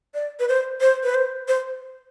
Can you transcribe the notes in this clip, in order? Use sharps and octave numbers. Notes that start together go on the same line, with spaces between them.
D5
B4
C5
C5
B4
C5
C5